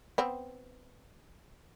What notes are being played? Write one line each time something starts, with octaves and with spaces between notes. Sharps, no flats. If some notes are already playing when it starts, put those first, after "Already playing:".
B3 C4